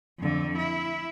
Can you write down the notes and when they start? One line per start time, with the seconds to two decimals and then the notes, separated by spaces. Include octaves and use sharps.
0.19 F2 D3
0.58 E4